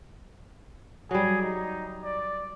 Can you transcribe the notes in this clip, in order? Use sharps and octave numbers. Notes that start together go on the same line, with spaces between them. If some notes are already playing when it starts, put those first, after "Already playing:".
F#3 G3 G#4
D#4
D5